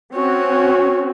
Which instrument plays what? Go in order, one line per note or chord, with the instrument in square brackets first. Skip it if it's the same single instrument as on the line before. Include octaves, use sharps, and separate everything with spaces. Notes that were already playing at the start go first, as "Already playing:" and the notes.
[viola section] C4 C#4 F#4 [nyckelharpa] C#5